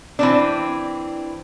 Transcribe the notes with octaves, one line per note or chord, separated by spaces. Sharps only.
E3 C4 D4